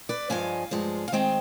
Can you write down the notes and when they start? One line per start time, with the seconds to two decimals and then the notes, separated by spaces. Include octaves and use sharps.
0.09 B4 D5
0.30 G2 F3 G#3 F5 G#5
0.71 G2 F3 G#3
1.08 F5
1.12 D#3 G#3 C4 D#5 G5